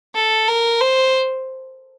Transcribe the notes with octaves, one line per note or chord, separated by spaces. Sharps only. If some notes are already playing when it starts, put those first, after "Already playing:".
A4
A#4
C5